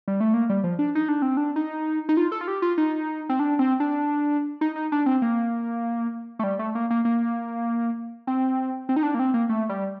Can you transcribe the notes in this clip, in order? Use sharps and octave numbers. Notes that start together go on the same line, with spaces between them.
G3
A3
A#3
G3
F3
D4
D#4
D4
C4
D4
D#4
D#4
F4
A4
F4
G4
F4
D#4
C4
D4
C4
D4
D#4
D#4
D4
C4
A#3
A3
G3
A3
A#3
A#3
A#3
C4
C4
D#4
D4
A#3
C4
A#3
A3
G3